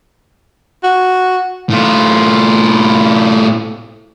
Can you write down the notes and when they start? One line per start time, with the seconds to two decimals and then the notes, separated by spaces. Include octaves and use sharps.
0.84 F#4
1.70 A2 F4